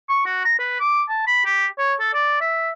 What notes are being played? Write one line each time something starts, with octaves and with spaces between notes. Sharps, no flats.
C#6
F#4
A#5
B4
D6
A5
B5
G4
C#5
A4
D5
E5